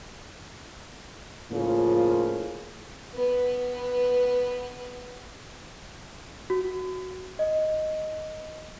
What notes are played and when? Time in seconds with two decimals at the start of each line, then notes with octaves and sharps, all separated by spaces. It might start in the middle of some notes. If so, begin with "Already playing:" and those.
1.51 A2 C#3 F3 A#3 F4
3.14 B3 B4
6.50 F#4
7.39 D#5